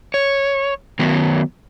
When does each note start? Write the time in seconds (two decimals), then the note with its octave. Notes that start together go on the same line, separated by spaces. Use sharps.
0.14 C#5
0.99 D#3 F#3 B3